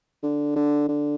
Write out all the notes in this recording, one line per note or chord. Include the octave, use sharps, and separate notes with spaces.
D3
D3
D3